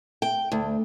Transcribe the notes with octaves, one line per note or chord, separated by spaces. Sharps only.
G5
D2